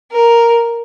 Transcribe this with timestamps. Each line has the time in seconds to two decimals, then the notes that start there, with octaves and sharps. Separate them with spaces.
0.12 A#4